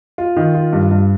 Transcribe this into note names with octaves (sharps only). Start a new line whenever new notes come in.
F4
D#3
F4
G2
G2